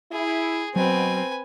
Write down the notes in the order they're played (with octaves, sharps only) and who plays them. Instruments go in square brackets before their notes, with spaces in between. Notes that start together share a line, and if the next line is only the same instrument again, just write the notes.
[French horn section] E4 [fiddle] G#4
[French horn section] B2 [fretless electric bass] F#3 [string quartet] C4 [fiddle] B4 G#5